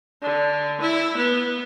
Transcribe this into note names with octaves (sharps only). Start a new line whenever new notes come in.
D3
E4
B3